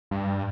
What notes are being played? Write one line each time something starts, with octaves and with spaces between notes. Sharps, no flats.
G2